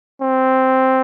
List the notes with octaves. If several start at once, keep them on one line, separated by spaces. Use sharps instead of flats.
C4